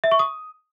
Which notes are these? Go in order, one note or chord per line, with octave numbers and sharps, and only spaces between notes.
E5
C#6
D#6